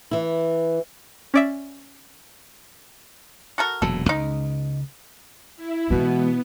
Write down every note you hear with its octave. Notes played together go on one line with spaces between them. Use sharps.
E3 E4
C#4 D5 E5
F#4 A4 A#4
E1 A#2 F#3 A4
C#2 D#4
E4
B2 E3 G#3 B3